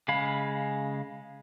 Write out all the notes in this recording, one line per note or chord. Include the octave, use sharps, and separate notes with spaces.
C#3 G#3 F5 B5